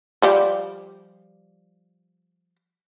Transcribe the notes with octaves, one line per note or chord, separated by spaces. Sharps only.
F3 G3 G4